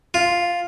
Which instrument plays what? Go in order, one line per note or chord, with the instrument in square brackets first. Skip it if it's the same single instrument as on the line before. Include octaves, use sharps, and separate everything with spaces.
[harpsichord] F4